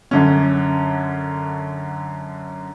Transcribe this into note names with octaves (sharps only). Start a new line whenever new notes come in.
F#2 D3 C#4